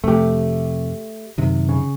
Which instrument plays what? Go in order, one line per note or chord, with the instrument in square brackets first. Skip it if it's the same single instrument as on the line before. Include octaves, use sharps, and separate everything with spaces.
[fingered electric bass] F2 C3 [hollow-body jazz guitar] A3 G4
[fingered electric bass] F#2 C3 D#3
[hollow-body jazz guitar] C#3